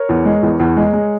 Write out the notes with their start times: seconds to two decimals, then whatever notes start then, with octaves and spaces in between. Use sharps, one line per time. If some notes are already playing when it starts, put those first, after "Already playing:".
Already playing: A#4 C#5
0.09 E2
0.25 G#3
0.43 E2
0.60 E2
0.77 G#3
0.93 G#3